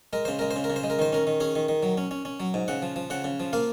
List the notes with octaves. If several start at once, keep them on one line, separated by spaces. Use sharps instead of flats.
G#3 A#4
C#3 C5
G#3 A#4
C5
C#3
A#4
C#3
C5
G#3
A#4
D#3 C5
C#4 A#4
D#3
C#4 G#4
D#3
D#3
F#3
C#4
C#4
C#4
F#3
G#2
C#3 F#5
F3
F3
C#3 F#5
C#3
F3
A#3 F5